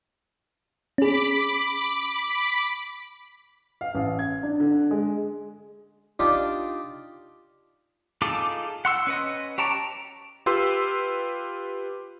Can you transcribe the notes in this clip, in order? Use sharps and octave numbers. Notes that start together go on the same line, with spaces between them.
C#4 G#4 B5 D6 B6
F5
A1
G#6
D4
D3
G#3
D4 D#4 F4 G4
D#4 F4 G#4 A4 D6
F#5 C6 E6
C#4 B4 D#5
G4 C#5 A5 A#5 D6
F4 G4 B4 C6 E6